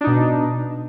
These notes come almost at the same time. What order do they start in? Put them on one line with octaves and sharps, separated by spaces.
D4 D#4 B2